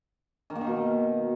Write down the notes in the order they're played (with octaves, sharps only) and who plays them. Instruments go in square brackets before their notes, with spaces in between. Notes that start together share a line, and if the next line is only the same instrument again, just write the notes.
[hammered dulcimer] D#3
A#3
D#3
B2